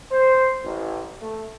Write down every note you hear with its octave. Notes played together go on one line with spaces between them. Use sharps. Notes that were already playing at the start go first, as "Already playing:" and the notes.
C5
A1
A3